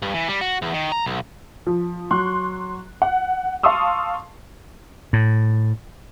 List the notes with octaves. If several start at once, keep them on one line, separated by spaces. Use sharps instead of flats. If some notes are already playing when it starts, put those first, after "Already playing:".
G2
E3
G3
F#4
E2
D#3
A#5
B1
F3
F#3 C6 C#6 F#6
F#5
F5 A5 C6 C#6 D#6 E6
A2